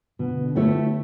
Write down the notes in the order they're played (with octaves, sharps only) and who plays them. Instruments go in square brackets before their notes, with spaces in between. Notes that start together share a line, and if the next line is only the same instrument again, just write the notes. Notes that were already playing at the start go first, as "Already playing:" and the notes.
[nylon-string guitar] B2 [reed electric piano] D3
[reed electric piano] D3
[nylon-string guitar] A3 E4 G4 C#5
[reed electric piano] B3